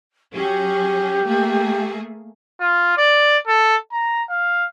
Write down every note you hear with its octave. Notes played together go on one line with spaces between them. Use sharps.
F#3 C#4 G4 G#4
A3 A#3 G#4
F4
D5
A4
A#5
F5